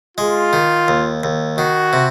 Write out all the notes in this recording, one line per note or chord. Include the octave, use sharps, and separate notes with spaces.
G#3 F4
D#3
D#2
D#2
D#3 F#4
C3